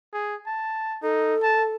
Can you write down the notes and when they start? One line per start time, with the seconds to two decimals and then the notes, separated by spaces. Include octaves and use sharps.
0.13 G#4
0.47 A5
1.03 D#4 A4
1.43 A5